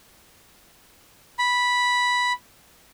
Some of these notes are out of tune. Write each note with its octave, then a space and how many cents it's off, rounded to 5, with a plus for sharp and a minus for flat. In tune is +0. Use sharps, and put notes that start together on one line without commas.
B5 -5